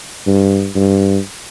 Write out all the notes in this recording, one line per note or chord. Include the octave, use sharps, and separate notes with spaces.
G2
G2